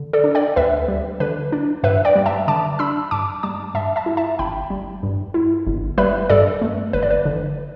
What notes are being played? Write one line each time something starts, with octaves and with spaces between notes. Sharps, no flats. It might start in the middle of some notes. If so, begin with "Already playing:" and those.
Already playing: D3
A4 D5
D4
D5 G5
D2 B4 E5
G3
D3 B4
D4
G2 B4 E5
D5 G5
G3
E5 A5
D3 A5 D6
D4 B5 E6
G2 A5 D6
G3 A5 D6
G2 E5 A5
E5 A5
E4
E5 A5
G1 G5 B5
G3
G2
E4
G1
G3 B4 E5
G2 A4 D5
A3
G1 B4
D5
B4
D3